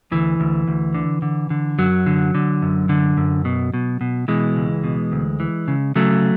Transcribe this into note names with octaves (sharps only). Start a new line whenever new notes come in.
D2 E3
D2
D2
D3
D3
D3
F#2 F#3
D3
D3
F#2
D3
F#2
B2
B2
B2
B2 E3 G#3
C#2
B2
D2
E3
C#3
C#3 F#3 A3